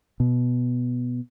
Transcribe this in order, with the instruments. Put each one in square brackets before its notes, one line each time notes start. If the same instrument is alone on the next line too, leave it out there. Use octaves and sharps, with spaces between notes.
[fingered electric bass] B2